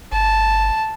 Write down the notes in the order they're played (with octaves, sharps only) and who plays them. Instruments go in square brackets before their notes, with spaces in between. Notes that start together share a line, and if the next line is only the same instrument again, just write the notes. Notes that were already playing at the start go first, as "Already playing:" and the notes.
[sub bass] G1 [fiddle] A5